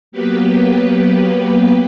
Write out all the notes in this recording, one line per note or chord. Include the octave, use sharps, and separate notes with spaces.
F#3 A#3 B3 G4 B4